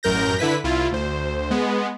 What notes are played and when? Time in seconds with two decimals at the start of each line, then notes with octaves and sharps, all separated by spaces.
0.03 A1 F#2 A#4 G6 A#6
0.39 D3 E4 B4 B6
0.64 C2 E4 F4
0.91 D2 C5
1.50 G#3 B3